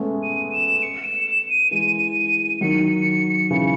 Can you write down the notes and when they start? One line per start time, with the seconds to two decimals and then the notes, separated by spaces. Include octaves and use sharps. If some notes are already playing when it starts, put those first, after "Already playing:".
Already playing: G#3 A3 B3 C#4
0.23 D#7
0.52 E7
0.82 C#7
1.04 E7
1.27 E7
1.49 D#7
1.71 E3 G#3 D#7
2.61 D#3 F#3 C#7
3.51 C#3 E3